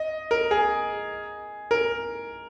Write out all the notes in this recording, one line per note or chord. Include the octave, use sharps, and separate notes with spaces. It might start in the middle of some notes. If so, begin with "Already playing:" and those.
Already playing: D#5
A#4
G#4
A#4